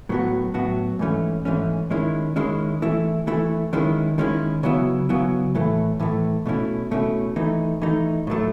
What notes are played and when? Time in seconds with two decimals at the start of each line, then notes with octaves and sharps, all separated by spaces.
0.09 A2 F#3 B3 F#4
0.54 A2 F#3 B3 F#4
0.99 G#2 E3 A3 C#4
1.45 G#2 E3 A3 C#4
1.90 D#3 G#3 C#4 E4
2.36 D#3 G#3 C#4 E4
2.82 E3 A3 E4
3.27 E3 A3 E4
3.73 D#3 G#3 C#4 E4
4.18 D#3 G#3 C#4 E4
4.63 C#3 F#3 B3 E4
5.09 C#3 F#3 B3 E4
5.55 A2 E3 A3
6.00 A2 E3 A3
6.46 B2 A3 C#4 E4
6.91 B2 A3 C#4 E4
7.36 E3 A3 D#4
7.82 E3 A3 D#4
8.27 A2 F#3 A3